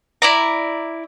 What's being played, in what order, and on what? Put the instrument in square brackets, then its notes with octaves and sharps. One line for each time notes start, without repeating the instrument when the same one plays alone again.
[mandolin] E4 D5 A#5